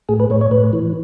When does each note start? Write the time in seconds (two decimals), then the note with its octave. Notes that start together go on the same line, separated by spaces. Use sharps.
0.09 A2 G#4
0.20 B4
0.30 A2 C#5
0.41 C#5
0.51 A2 B4
0.73 E3